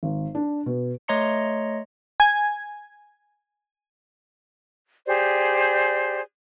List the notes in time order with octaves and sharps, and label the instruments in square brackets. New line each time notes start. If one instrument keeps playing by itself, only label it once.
[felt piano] G#1
D4
B2
[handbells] A3 C#5 D#5 A#5 C6 C#7
[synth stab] G#5 G#6
[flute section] G4 G#4 C5 D5